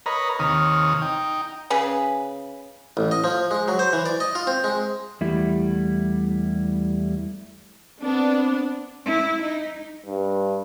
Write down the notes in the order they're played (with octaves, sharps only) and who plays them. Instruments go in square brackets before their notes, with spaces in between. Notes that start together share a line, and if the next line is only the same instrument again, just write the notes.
[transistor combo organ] A#4 B4 C#5 D#5 A#5 B5
D#2 C3 D#3 C#5 D#6 F6
D#4 G5
[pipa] C#3 G#4 B4
[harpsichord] A1
D#5
F3
G#3
F#3
C5
E3
D5
D#5
F4
C4
G#3
[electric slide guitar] E2 G3 A3 E4
[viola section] B3 D4 [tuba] C4
[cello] E4
D#4
[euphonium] G2